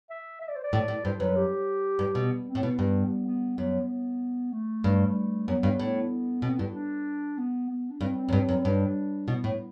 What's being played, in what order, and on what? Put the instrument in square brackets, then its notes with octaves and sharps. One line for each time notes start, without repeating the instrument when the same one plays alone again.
[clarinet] E5
E5
D5
C5
D5
[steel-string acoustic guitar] A2
A2
[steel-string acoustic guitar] G2 [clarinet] C5
[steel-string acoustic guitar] F#2 [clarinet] B4
[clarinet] G4
[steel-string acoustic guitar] G2
B2
[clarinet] C4
[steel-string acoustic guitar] A2
[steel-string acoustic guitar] B2 [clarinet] B3
[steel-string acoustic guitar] G2
[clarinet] B3
[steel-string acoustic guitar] F#2 [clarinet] B3
[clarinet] A3
[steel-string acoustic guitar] G2
[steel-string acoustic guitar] F#2 [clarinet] B3
[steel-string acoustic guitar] G2
A2
[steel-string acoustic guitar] B2 [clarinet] C4
[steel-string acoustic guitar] G2 [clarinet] E4
[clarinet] D4
B3
B3
D4
[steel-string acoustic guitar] G2 [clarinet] C4
[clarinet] C4
[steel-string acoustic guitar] F#2
G2
F#2
[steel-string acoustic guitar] G2 [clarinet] D4
[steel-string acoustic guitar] B2 [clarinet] E4
[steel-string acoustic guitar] A2